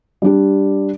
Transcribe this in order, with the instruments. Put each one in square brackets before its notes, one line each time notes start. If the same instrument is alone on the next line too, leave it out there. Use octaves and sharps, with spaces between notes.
[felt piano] G3 D4 G4